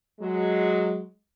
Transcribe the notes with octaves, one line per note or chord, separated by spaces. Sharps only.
F#3 G#3